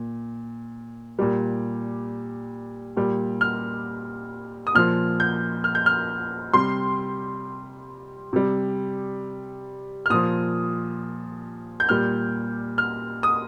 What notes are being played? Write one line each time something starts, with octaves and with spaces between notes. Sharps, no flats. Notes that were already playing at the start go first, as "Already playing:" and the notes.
Already playing: A#2
A#2 G3
A#2 G3
F6
D#6
A#2 F3 F6
G6
F6
G6
F6
C3 G3 C6
C3 G3
F6
A#2 F3 D#6
G6
A#2 G3 F6
F6
D#6